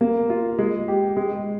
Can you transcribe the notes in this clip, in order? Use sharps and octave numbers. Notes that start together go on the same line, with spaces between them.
A#3
F4
G#3
G4
G#3